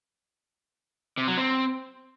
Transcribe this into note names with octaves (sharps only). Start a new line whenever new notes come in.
C3
F#3
C4